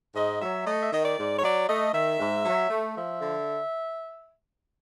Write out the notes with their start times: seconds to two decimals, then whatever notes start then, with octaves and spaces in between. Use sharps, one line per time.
0.16 G#2 D#5
0.42 F#3 E5
0.67 A3 D#5
0.82 E5
0.92 D#3 D#5
1.05 D5
1.18 G#2
1.37 C#5
1.44 F#3 D5
1.69 A3 D#5
1.94 D#3 E5
2.19 G#2
2.45 F#3
2.70 A3
2.96 F3 E5
3.21 D3